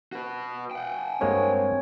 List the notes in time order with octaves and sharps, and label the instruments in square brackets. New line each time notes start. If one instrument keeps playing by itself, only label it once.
[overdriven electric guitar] F#4 B4
F#5 G5
[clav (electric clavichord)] G2 G#3 A#3 [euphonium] C4 [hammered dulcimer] C#5 G#5